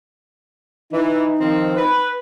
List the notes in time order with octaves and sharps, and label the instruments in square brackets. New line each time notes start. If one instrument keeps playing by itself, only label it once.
[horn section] E3 [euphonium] D#4
[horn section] D#3 F3 C4
B4